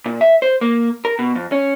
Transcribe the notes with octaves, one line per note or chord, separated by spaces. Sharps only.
A#2
E5
C5
A#3
A#4
B2
F2
C#4